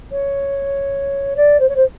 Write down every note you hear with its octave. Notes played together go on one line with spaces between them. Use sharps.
C#5
D5
C5
C#5
C5